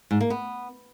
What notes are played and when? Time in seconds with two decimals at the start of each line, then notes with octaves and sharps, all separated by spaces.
0.11 G#2
0.20 A#3
0.30 B3